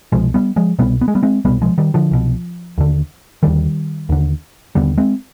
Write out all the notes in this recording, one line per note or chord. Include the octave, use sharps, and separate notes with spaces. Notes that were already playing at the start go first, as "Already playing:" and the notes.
C2 B2 F3 G#3
G3 B3
F3 G#3
C2 B2 G3 B3
B3
G#3
G3 B3
G#3 C4
C2 B2 G3 B3
F3 G#3
D#3 G3
D3 F3
C2 B2
D#2 D3
D#2 D3 D#3 G3
D#2 D3
D#2 D3 G3 B3
G#3 C4